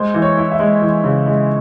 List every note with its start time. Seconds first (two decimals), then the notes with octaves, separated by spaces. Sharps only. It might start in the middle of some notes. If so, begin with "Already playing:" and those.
Already playing: G#3 C5
0.14 E3
0.22 C#5
0.37 E4
0.51 E5
0.60 G#3
0.82 E3
1.04 C#3
1.27 G#3